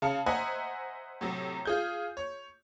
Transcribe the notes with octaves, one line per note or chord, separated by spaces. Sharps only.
C#3 F5 A5 C#7
C5 D#5 E5 F#5 G#5 A#5
A2 C3 F#3
F4 G#4 G6
C#5